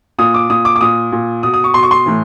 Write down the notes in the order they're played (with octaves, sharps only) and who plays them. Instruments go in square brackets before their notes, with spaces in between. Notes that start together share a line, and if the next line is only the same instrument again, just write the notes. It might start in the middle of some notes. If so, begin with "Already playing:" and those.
[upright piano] A#2 D#6
D6
A#2 D#6
D6
D6
A#2 D#6
A#2
B2 D#6
D#6
C#6
B2 C6
C#6
C6
A2 E3